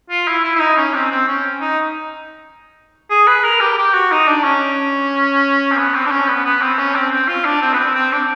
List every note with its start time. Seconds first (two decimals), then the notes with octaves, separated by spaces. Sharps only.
0.10 F4
0.28 E4
0.44 E4
0.56 E4
0.60 D#4
0.77 C#4
0.94 C4
1.11 C4
1.28 C#4
1.61 D#4
3.10 G#4
3.27 B4
3.44 A#4
3.60 G4
3.78 G4
3.94 F#4
4.12 D#4
4.27 D4
4.44 C#4
5.72 C4
5.77 B3
5.94 C4
6.06 D4
6.11 C#4
6.29 B3
6.45 B3
6.61 C4
6.79 C#4
6.95 C4
7.12 C4
7.28 F4
7.45 D4
7.62 C4
7.73 B3
7.79 C4
7.95 C4
8.12 D4